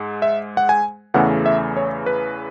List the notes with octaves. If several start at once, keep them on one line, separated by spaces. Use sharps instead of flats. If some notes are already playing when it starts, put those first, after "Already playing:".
Already playing: G#2 G#3
E5
F#5
G#5
E2 C#3 E3 A3 F#5
E5
C#5
B4